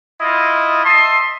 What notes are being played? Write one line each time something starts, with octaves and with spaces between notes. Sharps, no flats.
E4 F4 D#5
D#5 E5 A5 C6